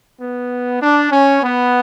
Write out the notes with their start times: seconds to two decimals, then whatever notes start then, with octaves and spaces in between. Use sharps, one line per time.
0.21 B3
0.81 D4
1.11 C#4
1.42 B3